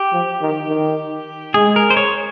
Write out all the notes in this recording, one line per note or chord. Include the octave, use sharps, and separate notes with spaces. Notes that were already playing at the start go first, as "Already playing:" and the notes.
Already playing: G4
F3
D#3
D#3
G#3 G#4
A#4
C5
C#5